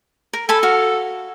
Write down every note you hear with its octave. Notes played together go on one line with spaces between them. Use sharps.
A#4
A4 G#5 A5 B5
F#4 F5